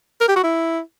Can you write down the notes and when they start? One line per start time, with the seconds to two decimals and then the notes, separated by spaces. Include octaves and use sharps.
0.21 A#4
0.28 G4
0.36 F#4
0.43 E4